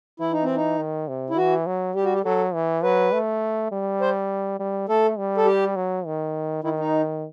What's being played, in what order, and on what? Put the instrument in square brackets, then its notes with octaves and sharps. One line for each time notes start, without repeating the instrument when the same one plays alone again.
[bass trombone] E3 [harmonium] E4
[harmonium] D#4
C4
D#4
[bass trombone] D#3
C3
[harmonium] E4
[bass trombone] E3 [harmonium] F#4
[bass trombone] F#3
[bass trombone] G3 [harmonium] G4
[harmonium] F#4
G4
[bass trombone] F#3 [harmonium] A4
[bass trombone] E3
[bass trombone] F#3 [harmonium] B4
[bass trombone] A3
G3
[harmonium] C5
[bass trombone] G3
[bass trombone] A3 [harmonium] A4
[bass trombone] G3
[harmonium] A4
G4
[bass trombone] F#3
D#3
[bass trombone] D#3 [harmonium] E4
[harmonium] D#4